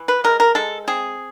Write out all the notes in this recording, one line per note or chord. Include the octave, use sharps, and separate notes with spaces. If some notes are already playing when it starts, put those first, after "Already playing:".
Already playing: E3
B4
G#3 A#4
A#4
G#3 A4
C4 G#4